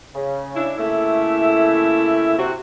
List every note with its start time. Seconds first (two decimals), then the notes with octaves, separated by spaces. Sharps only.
0.15 C#3
0.56 D4 E4
0.78 C#3 A3 A#3 E4 E5
2.38 C3 C4 F#4